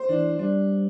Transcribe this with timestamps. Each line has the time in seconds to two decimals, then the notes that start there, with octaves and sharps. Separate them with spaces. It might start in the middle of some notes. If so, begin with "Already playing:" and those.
Already playing: C5
0.09 E3 D4
0.39 G3 D4